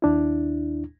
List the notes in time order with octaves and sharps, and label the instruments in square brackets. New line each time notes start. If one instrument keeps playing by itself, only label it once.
[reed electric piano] D#2 D4 E4